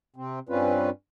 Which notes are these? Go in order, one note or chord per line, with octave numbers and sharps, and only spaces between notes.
C3 C4
G2 G3 C4 C#4 F4 B4